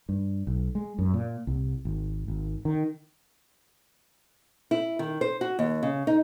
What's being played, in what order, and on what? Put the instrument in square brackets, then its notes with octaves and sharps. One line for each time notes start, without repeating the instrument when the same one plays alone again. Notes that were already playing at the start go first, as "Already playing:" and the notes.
[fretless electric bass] G2
B1
G#3
F#2
A#2
C2
G#1
G#1
D#3
[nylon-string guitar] E4
D#3
C5
F#4
D#2
C#3
D#4